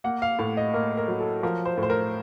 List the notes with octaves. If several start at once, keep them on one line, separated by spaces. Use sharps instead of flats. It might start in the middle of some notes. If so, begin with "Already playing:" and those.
A#3 F#5
F5
A2 F5
D#5
A#3 A#4
A#4
F#3
A4
F3 A#4
C5
A2
C5
A#4